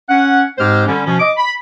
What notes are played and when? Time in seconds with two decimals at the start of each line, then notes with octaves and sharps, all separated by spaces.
0.09 C#4 F#5
0.58 G#2 G#3 C4 G4 C5 F6
0.87 D3 G3 C#4
1.06 B2 F3 C#4
1.19 D#5 D6
1.37 B5